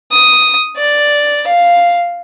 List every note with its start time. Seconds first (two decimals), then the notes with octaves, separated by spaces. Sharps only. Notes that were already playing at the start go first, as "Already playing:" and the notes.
0.12 D#6
0.77 D5
1.47 F5